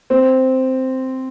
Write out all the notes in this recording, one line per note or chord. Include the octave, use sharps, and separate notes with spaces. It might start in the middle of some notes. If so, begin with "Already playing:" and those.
C4